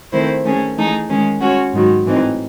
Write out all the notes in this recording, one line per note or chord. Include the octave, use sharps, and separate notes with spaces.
D#3 A3 C4 E4 C5
D#3 A3 C#4 G#4
E3 A3 D#4 G#4
D#3 G#3 C#4 G#4
G#3 C#4 F#4 C#5
G#2 D#3 F#3
A2 E3 C4 D#4